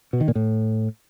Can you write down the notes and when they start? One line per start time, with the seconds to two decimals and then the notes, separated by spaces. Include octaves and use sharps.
0.13 B2
0.21 D#3
0.28 A#2
0.35 A2